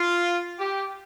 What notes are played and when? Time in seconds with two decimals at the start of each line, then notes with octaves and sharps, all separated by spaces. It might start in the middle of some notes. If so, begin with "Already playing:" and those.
Already playing: F4
0.59 G4